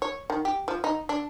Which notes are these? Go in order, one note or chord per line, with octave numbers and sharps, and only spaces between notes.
C#5
D#3
G4
F3
D#4
D4